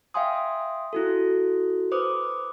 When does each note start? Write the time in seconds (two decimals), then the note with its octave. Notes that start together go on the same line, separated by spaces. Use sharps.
0.14 E5 F5 G5 G#5 C6 D#6
0.93 E4 F#4 A4
1.92 B4 C5 D6 D#6